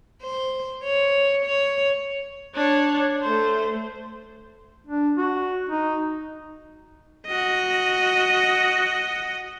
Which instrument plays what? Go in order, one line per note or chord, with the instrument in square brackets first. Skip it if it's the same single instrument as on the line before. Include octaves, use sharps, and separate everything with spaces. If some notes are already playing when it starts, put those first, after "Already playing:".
[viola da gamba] C5
C#5
C#5
[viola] D4 C#5
A3 C5
[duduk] D4
F#4
D#4
[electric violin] F#4 D#5